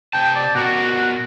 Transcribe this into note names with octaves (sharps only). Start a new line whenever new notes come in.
C3 G5 A5
D5
B2 F#4 A#4 F#5